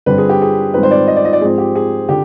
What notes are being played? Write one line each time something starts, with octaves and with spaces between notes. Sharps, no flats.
G2 D3 G3 C4 B4
G#4
G4
G#4
G#2 D#3 G3 C4 B4
C5
D5
D#5
D5
D#5
D5
G#2 F3 C4 G#4
G4
G#4
D3 G4